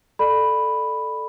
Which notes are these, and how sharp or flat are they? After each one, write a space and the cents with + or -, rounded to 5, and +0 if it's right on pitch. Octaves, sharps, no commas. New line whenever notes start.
A4 +0 D5 +30 B5 +0